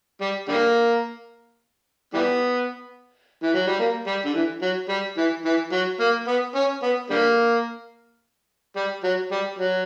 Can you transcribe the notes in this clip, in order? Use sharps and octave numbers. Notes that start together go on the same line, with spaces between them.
G3
D3 G3 A#3
E3 G3 B3
E3
F#3
G3
A#3
G3
D3
E3
F#3
G3
E3
E3
F#3
A#3
B3
C#4
B3
D3 G3 A#3
G3
F#3
G3
F#3